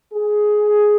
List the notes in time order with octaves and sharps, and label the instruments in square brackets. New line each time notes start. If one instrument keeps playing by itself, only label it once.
[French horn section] G#4